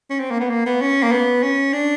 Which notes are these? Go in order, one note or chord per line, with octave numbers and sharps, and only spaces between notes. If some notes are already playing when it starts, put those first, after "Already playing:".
C#4
C4
A#3
B3
A#3
B3
C#4
A#3
B3
C#4
D4